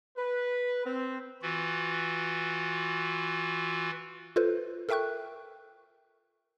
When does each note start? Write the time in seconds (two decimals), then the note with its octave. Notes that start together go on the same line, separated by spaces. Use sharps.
0.17 B4
0.86 C4
1.42 E3 F4 F#4
4.36 F4 A4 B4 C5
4.89 A4 A#4 E5 G5 C#6 F#6